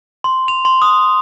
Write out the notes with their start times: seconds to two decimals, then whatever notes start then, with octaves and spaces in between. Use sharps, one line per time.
0.24 C6
0.48 F7
0.65 C6
0.82 D#6